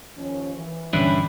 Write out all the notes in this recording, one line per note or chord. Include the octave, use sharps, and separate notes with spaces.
D#2 F3 C#4
E3
G2 A#2 D3 E3 C#4 D4 E4 B4